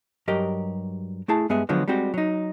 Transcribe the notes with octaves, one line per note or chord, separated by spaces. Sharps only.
G2 F#3 G4 A#4 D#5
A3 E4 G#4 A5
G2 G#3 B3 G#4 E5
D3 F3 F#3 G#3 B3
G3 G#3 C4 F#4 G4
F#3 D#4